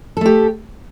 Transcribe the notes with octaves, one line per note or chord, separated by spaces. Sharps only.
A3 G4 A4